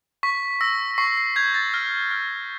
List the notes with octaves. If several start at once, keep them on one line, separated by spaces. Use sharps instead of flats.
C#6 B6
E6 A#6
C#6 C7
C7
G6 G#6
A6
F6 A#6
F6